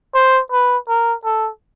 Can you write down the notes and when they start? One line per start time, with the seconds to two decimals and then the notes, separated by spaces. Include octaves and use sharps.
0.15 C5
0.52 B4
0.88 A#4
1.25 A4